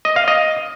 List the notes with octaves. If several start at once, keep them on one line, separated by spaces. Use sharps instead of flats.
D#5
F5
D#5